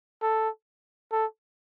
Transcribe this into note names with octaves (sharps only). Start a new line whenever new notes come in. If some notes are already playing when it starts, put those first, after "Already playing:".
A4
A4